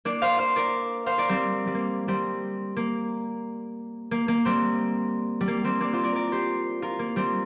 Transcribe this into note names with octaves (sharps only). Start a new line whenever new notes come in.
A#3 D4
C5 F5
C5 F5
A#4 D5
C5 F5
A#4 D5
G3 C4
G3
A#3
G3 C4
A#3
A#3
A#3
G3 C4
G3
A#3
G3 C4
A#3 D4
C4 F4
A#4 D5
A#4 D5
G4 C5
F4 A#4
A#3
G3 C4